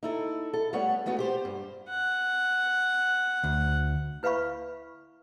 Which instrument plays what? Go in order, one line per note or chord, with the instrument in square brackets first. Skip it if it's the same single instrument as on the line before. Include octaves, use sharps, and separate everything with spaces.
[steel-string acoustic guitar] D#4 E4 A4
A4
G3 A3 B3 C#5 F#5
G#3 A3 B3 F#4
G4 C5
G2
[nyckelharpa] F#5
[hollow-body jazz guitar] D2
[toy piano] E4 B4 E5 F5 B5 C#6